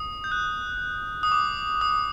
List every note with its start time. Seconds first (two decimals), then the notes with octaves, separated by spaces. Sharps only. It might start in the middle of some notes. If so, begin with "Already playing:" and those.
Already playing: D#6
0.24 G6
0.31 F#6
1.23 D#6
1.32 D6
1.81 D#6